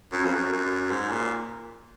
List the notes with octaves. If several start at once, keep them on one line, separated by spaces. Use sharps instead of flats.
F#2
F2
F#2
F#2
G#2
A#2